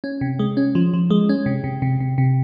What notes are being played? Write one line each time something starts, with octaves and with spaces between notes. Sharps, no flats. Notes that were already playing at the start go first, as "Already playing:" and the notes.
C#4
C3
G#3
C#4
F3
F3
G#3
C#4
C3
C3
C3
C3
C3